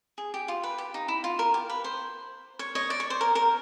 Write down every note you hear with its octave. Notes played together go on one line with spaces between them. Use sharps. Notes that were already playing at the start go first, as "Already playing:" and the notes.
G#4
G4
F4
B4
G4
D#4
E4
F4
A#4
G4
B4
C5
C#5
C#5 D#5
D5
C#5
C5
A#4
A#4